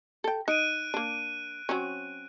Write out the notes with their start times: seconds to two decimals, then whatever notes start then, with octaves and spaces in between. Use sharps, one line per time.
0.24 A4 G5
0.48 D#4 F#6 D7 D#7
0.94 A#3 D4
1.69 F#3 C4 C#4